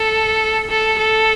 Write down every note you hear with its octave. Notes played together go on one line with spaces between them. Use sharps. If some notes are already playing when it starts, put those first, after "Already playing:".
Already playing: A4
A4
A4